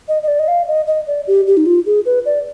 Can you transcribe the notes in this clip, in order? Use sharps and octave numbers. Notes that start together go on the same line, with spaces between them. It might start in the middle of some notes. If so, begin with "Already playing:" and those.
D#5
D#5
D5
D#5
F5
D#5
D#5
D5
G4
G4
D#4
F4
G#4
B4
D5